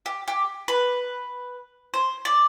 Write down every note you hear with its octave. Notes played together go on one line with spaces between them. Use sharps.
G4
G4
B4
C5
D5